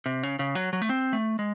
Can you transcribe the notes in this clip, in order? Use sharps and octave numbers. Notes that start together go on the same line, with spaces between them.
C3
C#3
C#3
F#3
F#3
A3
C4
A3
G#3